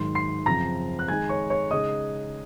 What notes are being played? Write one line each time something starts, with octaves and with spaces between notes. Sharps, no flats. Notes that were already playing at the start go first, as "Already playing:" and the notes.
Already playing: G#2 D#3 F#3 C6
C6 C7
F#2 C#3 F3 C4 A#5 A#6
F#6
D#3 G#3 D#4 G#5 G#6
C#5 C#6
C#5 C#6
C#3 G#3 D#4 D#5 D#6